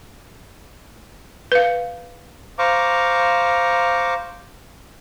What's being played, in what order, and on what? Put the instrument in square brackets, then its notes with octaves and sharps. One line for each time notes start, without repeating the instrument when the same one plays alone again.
[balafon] B4 F5
[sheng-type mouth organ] C5 F5 A#5 C#6 D6